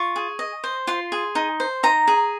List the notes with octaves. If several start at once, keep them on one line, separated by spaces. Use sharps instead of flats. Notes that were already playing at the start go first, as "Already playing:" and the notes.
Already playing: F4 C#6
G#4
D#5
C5
F4 C6
G#4
D#4
C5
D#4 A#5
G#4